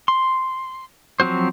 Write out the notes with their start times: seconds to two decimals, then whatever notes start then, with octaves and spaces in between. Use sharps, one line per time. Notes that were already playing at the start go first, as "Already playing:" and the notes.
0.08 C6
1.20 F3 F#3 C4 F#4 C5